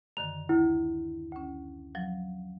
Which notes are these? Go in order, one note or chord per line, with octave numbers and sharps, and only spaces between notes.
F#2 D3 D#3 F7
D2 E4
D2 C#4
F3 F#3